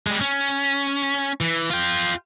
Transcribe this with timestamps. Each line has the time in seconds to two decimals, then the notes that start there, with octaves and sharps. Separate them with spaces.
0.07 G3 G#3
0.21 C#4
1.41 E3
1.70 F4 G5